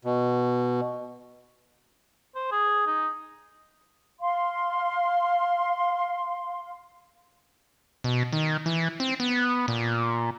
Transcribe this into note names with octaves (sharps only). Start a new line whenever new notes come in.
B2
C5
G#4
D#4
F5 C6
B2
D#3
E3
C4
B3
A#2